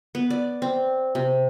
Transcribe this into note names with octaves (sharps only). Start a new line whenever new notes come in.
B3
D5
C4
C3